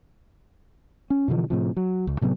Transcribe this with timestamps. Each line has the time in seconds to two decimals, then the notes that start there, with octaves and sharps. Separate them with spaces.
1.10 C#4
1.28 B2 D3 E3 F3
1.50 A2 C3 F3
1.77 F#3
2.07 C#2
2.21 A2 C3 F#3 B3